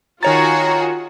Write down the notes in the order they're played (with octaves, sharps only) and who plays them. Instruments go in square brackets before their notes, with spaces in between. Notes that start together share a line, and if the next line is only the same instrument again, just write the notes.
[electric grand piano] D#3 C#5 A6 [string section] F4 F#4 G#4 [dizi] A#5